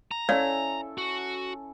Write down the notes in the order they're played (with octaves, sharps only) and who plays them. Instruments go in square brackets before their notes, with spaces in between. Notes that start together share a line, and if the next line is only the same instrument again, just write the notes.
[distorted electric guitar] A#5
[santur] C#4 E4 A4 [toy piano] C#5 D5 F5
[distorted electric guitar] F#4